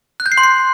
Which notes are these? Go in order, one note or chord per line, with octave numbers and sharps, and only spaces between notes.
F#6
G6
C7
C6
C7